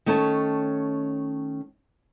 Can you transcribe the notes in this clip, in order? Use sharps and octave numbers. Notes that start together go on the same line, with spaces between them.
D#3 A3 C#4 C#5 A5